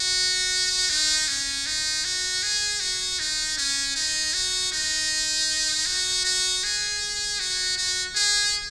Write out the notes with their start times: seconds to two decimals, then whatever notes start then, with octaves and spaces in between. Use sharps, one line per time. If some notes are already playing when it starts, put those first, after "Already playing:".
Already playing: F#4
0.90 D#4
1.28 C#4
1.66 D#4
2.05 F#4
2.43 G#4
2.80 F#4
3.19 D#4
3.58 C#4
3.96 D#4
4.34 F#4
4.72 D#4
5.86 F#4
6.25 F#4
6.63 G#4
7.40 F#4
7.77 F#4
8.15 G#4